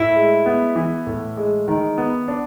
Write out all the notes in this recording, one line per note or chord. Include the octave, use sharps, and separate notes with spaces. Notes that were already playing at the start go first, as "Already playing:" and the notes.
Already playing: A2 E4
G#3
B3
E3
A2
G#3
D#3
B3
D4